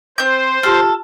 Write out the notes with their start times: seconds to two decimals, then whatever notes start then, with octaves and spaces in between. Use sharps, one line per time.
0.18 C4 C5 G6
0.63 F4 G4 A4 F6